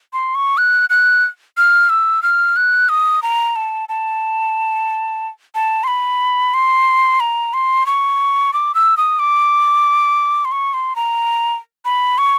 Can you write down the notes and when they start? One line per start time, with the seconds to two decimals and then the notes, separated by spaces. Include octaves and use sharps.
0.13 C6
0.35 C#6
0.58 F#6
0.90 F#6
1.57 F6
1.90 E6
2.23 F6
2.56 F#6
2.89 D#6
3.23 A#5
3.56 A5
3.89 A5
5.55 A5
5.84 C6
5.88 B5
6.54 C6
7.20 A#5
7.54 C6
7.86 C#6
8.53 D6
8.75 E6
8.97 D#6
9.19 D6
10.45 C6
10.52 C#6
10.74 C6
10.96 A#5
11.85 B5
12.18 C#6